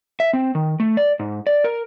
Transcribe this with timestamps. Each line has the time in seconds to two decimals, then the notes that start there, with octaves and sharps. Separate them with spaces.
0.20 E5
0.33 C4
0.55 D#3
0.80 A3
0.97 D5
1.19 G#2
1.47 D5
1.64 A#4